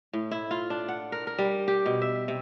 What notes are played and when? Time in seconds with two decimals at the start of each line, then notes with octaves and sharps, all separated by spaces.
0.13 A2
0.31 E4
0.51 F4
0.70 D4
0.88 F#5
1.12 A#4
1.27 A#4
1.38 G3
1.68 G4
1.86 B2
2.02 E5
2.28 C3